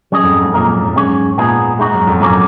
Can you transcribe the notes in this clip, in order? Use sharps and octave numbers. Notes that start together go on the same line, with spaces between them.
F#3 C#4 G#4 D#5
F2
F#2
G#2
A#2 A#3 D#4 A#4
F#2
F#2
G#2 F#3 C#4 G#4 C#5
A#2 B3 D#4 G#4
G#2 G#3 D#4 F#4
F#2
F2
F#2 A#2 F#3 A#3 C#4 F#4